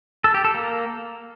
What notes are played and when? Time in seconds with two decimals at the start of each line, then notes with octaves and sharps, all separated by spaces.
0.24 A4
0.34 G4
0.44 A4
0.55 A#3